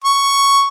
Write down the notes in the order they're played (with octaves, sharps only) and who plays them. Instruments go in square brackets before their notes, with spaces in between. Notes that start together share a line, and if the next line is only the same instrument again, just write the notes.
[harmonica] C#6